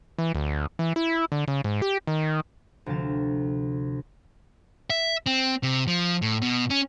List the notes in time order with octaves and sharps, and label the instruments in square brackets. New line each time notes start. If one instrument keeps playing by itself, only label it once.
[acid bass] E3
D2
E3
E4
D3
C#3
G#2
G4
D#3
[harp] D2 C3 F3 F5 A6 E7
[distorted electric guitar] E5
C4
C3
F3
A2
B2
C#4